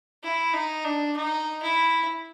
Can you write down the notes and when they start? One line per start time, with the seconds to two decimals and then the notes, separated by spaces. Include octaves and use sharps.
0.23 E4
0.53 D#4
0.84 D4
1.16 D#4
1.63 E4